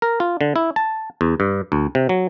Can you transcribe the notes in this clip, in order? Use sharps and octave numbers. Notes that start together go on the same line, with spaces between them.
A#4
F4
D3
E4
A5
E2
G2
D2
C3
F#3